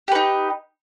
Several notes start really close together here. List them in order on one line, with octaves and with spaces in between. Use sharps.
G4 B4 D#4